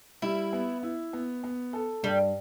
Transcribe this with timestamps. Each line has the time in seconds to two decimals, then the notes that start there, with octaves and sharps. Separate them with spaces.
0.22 G3 E4
0.53 B3
0.83 E4
1.13 B3
1.44 B3
1.73 A4
2.03 G2 G3